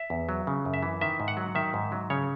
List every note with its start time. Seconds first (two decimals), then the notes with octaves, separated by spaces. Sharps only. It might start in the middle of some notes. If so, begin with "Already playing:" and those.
Already playing: E5
0.10 E2
0.29 F#3
0.47 C#3
0.65 F#2
0.74 E5
0.83 E3
1.01 D#3 E5
1.20 G#2
1.28 F#5
1.37 F#3
1.55 D#3 E5
1.74 G#2
1.92 F#3
2.10 C#3 C#5